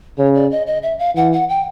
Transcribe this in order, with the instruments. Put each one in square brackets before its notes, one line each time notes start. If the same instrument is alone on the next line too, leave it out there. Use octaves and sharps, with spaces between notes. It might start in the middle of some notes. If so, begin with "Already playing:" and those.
[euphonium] C#3 [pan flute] C#5
[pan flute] D5
D#5
D#5
E5
F5
[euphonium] E3 [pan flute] F#5
[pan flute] F#5
G5